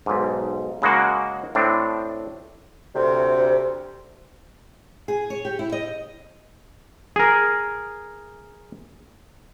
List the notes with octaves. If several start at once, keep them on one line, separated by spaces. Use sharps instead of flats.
B1 G#2
C#3 G#3 A#3 F#4
A2 C4 D4
D2 C3
G#4
C#5
G4
E4
D#5
G#4 A#4